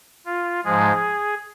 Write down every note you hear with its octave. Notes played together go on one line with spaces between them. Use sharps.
F4
G#2 F3 G#3 G#4